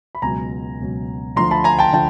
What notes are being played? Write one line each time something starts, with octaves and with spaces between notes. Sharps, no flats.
B5
C#2 B2 F#3 G#5 A#5
C#2 B2 F#3
D2 D3 F3 A#5 C6
A5 B5
G#5 A#5
G5 A5
D3 F3 G5 A5